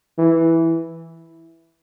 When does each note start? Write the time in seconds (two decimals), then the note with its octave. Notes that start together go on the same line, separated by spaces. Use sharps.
0.18 E3